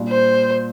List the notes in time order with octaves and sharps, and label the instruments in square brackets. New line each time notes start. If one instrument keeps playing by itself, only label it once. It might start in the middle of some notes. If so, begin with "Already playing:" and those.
Already playing: [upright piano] A#2 G3 D4
[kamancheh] C5